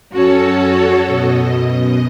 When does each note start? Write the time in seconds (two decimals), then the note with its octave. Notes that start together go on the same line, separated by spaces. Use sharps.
0.13 F#2 C#4 F#4 A4 C#5 A5
1.05 F#2 B2 D#5